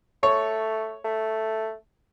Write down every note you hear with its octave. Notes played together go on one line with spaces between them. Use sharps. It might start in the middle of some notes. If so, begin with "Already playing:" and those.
A3 C#5
A3